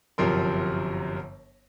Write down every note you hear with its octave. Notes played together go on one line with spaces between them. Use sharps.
G1 F#2 C3 F3 A#4 C6